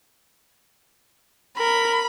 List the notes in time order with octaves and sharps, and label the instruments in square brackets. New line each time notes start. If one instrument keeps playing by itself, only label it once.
[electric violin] A#4 [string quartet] B5